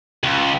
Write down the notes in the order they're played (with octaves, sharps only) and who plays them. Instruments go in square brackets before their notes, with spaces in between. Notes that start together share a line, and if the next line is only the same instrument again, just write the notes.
[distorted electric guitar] C#2